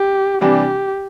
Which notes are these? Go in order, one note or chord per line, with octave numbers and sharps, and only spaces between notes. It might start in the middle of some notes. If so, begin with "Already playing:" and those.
Already playing: G4
C3 E3 G3 D4 G4